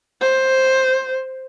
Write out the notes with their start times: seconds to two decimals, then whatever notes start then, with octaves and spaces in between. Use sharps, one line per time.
0.21 C5